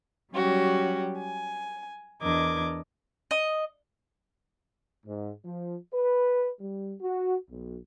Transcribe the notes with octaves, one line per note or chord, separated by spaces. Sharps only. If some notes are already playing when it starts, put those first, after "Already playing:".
F#3 G3 C#4 F#4 G4
G#5
E2 D4 A#4 D#5 D6 G#6
D#5
G#2
F3
B4
G3
F#4
B1